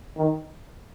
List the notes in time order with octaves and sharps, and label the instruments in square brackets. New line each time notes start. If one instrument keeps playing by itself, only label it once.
[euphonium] D#3